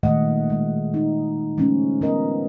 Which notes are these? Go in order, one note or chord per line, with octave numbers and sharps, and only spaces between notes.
A#2 D#3 G#3 A3 D#5 F#5
G#3
D#4
F3 G#3 A3 C#4
F3 B3 A#4 D#5